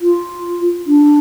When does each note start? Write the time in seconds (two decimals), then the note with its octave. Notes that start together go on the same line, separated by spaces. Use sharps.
0.01 F4
0.87 D4